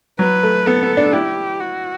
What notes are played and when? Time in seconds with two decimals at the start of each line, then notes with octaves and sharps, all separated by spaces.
0.19 F#3 B4
0.43 A3
0.66 B3 A4
0.83 B3
0.97 D4
1.13 E4 G4
1.60 F#4